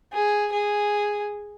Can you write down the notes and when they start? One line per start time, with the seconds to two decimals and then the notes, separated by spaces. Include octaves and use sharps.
0.13 G#4
0.52 G#4